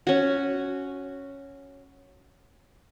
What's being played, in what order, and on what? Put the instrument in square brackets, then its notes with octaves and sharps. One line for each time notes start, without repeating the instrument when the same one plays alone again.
[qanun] C#4 F#4